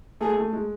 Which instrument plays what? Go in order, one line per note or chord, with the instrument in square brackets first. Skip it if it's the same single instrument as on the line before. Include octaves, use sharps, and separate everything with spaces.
[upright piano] A3 [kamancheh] G#4
[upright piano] A3
G#3